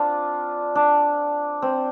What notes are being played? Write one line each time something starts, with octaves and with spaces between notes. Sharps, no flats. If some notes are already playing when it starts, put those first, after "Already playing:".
Already playing: C4 D4 F4
D4
C4